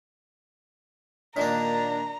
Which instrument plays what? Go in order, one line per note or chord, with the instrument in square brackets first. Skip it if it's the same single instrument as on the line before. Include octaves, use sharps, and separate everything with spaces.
[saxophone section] A#2 D4 [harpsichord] D#3 A#3 [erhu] A#5